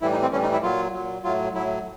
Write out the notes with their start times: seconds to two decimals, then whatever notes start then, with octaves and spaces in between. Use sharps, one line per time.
0.02 A2 E3 G3 E4
0.12 D#4
0.22 C4
0.32 A2 E3 G3 C#4
0.43 D#4
0.53 E4
0.63 A#2 F#3 F4
0.94 A#2 F#3
1.24 A2 F#3 F4
1.54 A2 F#3 E4